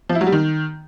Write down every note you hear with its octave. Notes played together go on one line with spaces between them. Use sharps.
F3
E4
F#3
G3
D#3